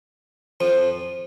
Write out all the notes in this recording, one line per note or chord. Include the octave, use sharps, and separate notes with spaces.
F2 F3